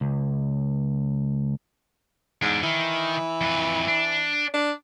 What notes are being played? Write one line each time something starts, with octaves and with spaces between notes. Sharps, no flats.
C#2
E2 G#2 D4
D#3 E3
F2 B4
D4
D4